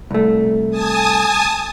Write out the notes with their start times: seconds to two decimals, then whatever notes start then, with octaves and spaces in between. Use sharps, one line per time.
0.11 C2 A3
0.70 G#5 A5 D#6